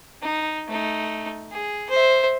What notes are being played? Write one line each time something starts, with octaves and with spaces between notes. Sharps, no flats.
D#4
A3 D#4
G#4
C5 E5